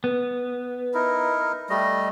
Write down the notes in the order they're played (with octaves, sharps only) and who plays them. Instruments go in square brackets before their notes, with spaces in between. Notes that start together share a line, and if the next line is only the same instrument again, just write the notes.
[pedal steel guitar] B3
[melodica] D#4 E4 A#4
G3 A3 D#5